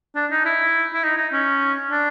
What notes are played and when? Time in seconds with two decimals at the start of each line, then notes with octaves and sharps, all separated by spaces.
0.16 D4
0.31 D#4
0.45 E4
0.93 E4
1.03 D#4
1.17 D#4
1.33 C#4
1.91 D4